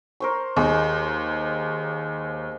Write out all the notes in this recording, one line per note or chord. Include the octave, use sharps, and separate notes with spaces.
A#4 C5 C#6
D#2 G#3